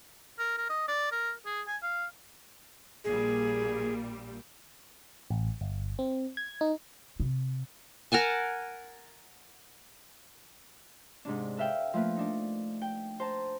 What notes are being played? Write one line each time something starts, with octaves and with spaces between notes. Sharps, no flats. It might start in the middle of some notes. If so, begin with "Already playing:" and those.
A#4
A#4
D#5
D5
A#4
G#4
G#5
F5
A#1 A#2 G3 G#4
A1
G1
C4
G#6
D#4
C3
A#4 F#5 G#5 A5
G#2 C3 D4
A4 B4 E5 F5 G5
F3 A3 A#3 B4
D4 D#4
G5
C5 A5 A#5